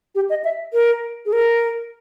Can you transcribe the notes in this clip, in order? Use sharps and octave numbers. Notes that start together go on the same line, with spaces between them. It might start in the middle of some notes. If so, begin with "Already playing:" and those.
G4
D#5
E5
A#4
G#4
A#4